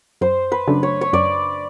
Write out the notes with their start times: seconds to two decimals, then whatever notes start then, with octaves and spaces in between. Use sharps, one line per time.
0.21 F#2 C5
0.52 B4
0.67 C#3 F#3 A3 D4
0.83 C#5
1.01 C#5
1.13 F#2 D5